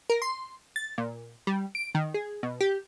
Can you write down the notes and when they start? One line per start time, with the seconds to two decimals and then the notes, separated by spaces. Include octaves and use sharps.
0.10 A#4
0.22 C6
0.76 A6
0.98 A#2
1.47 G3
1.75 D7
1.95 D#3
2.14 G#4
2.43 B2
2.61 G4